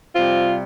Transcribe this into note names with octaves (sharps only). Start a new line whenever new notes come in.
C3 G3 C4 F4